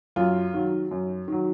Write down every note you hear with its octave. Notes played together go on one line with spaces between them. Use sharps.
F#2 F4
D#3 F#3
F#2
D#3 F#3